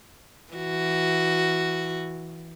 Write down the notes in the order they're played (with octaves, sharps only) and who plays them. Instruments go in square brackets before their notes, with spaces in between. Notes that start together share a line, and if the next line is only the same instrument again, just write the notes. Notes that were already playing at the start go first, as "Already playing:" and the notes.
[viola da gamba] E3 F#4